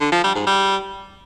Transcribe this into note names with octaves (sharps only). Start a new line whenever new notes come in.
D3
F3
G3
G#2
G3